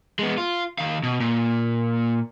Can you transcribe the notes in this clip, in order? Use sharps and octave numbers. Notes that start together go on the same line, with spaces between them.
G#3 B3
F4
D#3 F5
B2
A#2